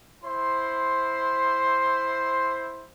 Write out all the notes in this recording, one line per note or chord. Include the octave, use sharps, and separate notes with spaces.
E4 C5 C6